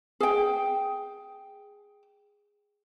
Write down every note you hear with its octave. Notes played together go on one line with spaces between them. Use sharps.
G#4 G5